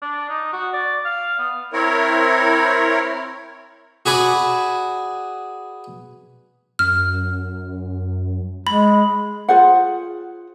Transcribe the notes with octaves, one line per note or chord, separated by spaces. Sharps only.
D4
D#4
F#4
D5
F5
B3
C4 E4 A#4 C#5
F#4 G#4 B4 D5
F#2 F6
G#3 B5
F4 G#4 C5 F#5